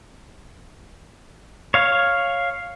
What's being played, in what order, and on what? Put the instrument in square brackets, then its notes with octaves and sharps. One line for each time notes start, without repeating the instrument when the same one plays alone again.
[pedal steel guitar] C#5 F5